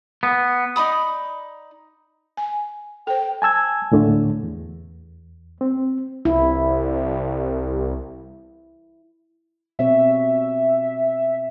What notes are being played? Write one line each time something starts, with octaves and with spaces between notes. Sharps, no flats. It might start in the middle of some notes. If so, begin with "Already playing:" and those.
B3
D#4 D5 B5 D#6
G#5
A4 C5 G5
G#5 A5 E6 G#6
D2 A2 D3 A3
E2
C4
C2 E4
B2 C4 C#5 E5